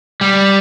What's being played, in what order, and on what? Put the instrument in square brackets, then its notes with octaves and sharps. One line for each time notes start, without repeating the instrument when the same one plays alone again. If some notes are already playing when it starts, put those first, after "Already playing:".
[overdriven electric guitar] G3